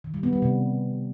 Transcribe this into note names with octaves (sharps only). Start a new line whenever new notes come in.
D#3
G3
B3
G3
C3